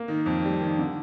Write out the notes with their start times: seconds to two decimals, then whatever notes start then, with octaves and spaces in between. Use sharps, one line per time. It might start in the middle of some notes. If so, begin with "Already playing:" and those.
Already playing: A#3
0.08 D#3
0.26 F2
0.44 G3
0.61 D#3
0.79 D3